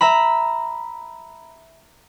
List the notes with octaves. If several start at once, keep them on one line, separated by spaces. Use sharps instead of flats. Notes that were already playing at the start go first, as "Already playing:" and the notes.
E5 A#5 B5